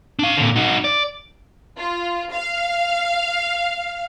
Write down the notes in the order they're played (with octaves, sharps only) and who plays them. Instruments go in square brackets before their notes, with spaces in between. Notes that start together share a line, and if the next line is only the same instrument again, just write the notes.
[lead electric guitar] D4 F5
A#2 D3
D#4 F#4
D5
[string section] F4
F5